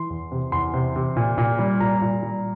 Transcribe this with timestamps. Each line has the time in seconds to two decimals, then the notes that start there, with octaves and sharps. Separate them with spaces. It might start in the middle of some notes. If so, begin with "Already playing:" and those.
Already playing: E3 C6
0.10 E2
0.32 C3
0.52 E2 C6
0.74 C3
0.96 C3
1.16 A#2
1.38 A#2
1.59 G3
1.80 A#2 A#5
2.02 A#2
2.23 G3